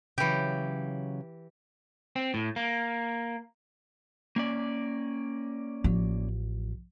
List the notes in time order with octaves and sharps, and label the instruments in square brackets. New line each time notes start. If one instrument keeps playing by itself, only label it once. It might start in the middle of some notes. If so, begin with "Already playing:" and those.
[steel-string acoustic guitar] C#3 F#3 [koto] E3 G4
[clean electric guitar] C4
A2
A#3
[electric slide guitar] A#3 C#4 D5
[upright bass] A1 F3